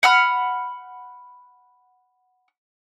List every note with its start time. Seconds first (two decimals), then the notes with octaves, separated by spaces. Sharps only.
0.03 F#5 B5 F6